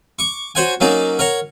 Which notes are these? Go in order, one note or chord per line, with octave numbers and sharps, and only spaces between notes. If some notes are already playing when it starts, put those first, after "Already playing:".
C#6 D6
F#4 C5 C#5 F#5 G#5
F#3 A#3 C#4 D#4 D5
A#4 C#5 F#5 A#5